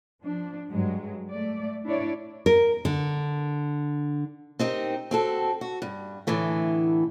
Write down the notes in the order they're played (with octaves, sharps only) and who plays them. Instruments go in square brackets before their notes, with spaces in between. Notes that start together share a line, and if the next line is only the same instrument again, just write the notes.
[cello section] F3 D4
G2 F#3 G#3
A3 D5
D4 E4 C#5 D5
[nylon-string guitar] A#4
D3
[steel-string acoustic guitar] C4 D#4 G4 A#4
C4 F#4 A4
F#4
G2
A2 D3 E3 A3